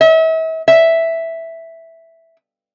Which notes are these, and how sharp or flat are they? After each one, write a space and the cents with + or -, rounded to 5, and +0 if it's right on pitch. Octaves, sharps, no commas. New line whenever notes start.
E5 -40
E5 +0